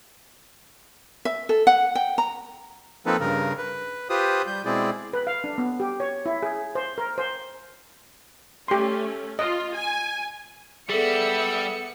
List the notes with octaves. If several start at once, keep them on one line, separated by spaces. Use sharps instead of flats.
E5
A4
F#5
G5
A#5
F3 A#3 C4 D#4 A4 B4
G2 C#3 A#4
B4
F4 G4 B4 C5 D#6
G3 G6
B2 G#3 C4 E4 G#4 D5
B4
F5
D4
B3
G4
C#5
E4
G#4
C5
A#4
C5
A3 C#4 G4 C6
F4 D#5
G#5
G3 B3 G#4 A4 E5 E6 C#7